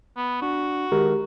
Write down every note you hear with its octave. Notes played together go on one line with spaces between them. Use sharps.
B3
D4 F#4
D#3 G#3 G4 A#4